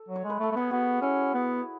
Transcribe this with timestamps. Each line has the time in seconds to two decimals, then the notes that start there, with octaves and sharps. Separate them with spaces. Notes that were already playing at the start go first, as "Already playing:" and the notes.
Already playing: A4
0.08 F#3
0.16 C#5
0.24 G#3
0.30 B4
0.39 A3
0.43 A4
0.51 A3
0.56 B3 G#4
0.71 B3 F#4
1.02 C#4 E4
1.33 B3